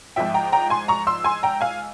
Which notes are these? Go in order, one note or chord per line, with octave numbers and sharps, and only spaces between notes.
G#2 F3 E5 G5
G5 A#5
G5 A#5
G#5 C6
A#5 C#6
C6 E6
G#5 C6
G5 A#5
F5 G#5